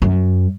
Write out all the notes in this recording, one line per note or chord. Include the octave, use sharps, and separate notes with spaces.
F#2